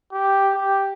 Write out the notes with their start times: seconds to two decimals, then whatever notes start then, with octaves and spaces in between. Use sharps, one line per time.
0.12 G4
0.54 G4